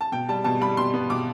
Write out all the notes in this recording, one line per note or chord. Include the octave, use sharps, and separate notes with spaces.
A5
B2 G5
G3 A5
B2 A5
G3 B5
B2 C6
B3
B2 D6